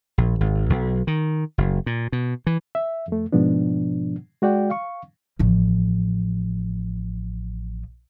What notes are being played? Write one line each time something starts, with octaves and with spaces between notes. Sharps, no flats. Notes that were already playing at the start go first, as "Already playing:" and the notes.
A#1
G#1
B1
D#3
F#1
A#2
B2
E3
E5
F2 A3
G#2 B2 F3 B3 D4
G#3 F#4 D5 G5
F5 C#6
A1 F3